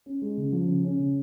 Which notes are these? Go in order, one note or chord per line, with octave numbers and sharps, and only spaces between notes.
C#4
G#3
C#3
F3
C#3
C#4
C#3